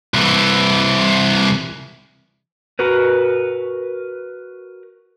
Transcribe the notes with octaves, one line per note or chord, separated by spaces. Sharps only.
C2 E3
F#4 A#4 B4